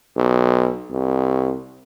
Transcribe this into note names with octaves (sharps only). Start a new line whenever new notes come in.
B1
C2